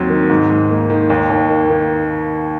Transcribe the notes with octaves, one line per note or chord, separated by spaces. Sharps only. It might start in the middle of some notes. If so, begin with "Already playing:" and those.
Already playing: D#2 F#3 C4
D#3
G#2
G#2
A#3
D#3
D#2
D#2
A#3
D#3